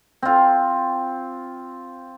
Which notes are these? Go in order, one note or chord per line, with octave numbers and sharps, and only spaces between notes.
C4 F4